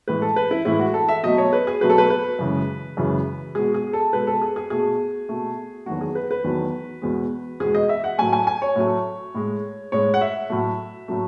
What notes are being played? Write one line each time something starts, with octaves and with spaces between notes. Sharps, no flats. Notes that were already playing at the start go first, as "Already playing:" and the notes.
A2 E3 G#3 B4
A4
B4
E4
A2 E3 G#3 E4
F#4
A4
E5
B2 F#3 A3 D#5
C#5
B4
G#4
B2 F#3 A3 B4
A4
B4
B4
F#2 C#3 E3 G#3
F#2 C#3 E3 G#3
B2 G#3 G#4
G#4
A4
B2 G#3 B4
A4
G#4
G#4
B2 A3 G#4
B2 A3
E2 D#3 F#3 A3 F#4
G#4
B4
B4
E2 D#3 F#3 A3
E2 B2 G#3
E2 B2 G#3 G#4
D#5
E5
F#5
A2 F#3 A3 G#5
G#5
G#5
C#5
A2 F#3 A3
A2 G#3
A2 G#3 C#5
F#5
E5
A2 F#3 A3
A2 F#3 A3